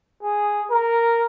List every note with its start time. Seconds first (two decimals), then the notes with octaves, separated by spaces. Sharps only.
0.23 G#4
0.71 A#4